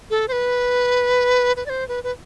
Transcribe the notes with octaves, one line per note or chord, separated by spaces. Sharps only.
A4
C5
B4
B4
D5
C5
B4
B4